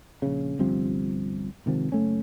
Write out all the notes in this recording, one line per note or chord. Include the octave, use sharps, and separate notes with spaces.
A#1 C#3
G1 C2 C3 F3
G#1 C3 D#3 F3
F#1 A3 C#4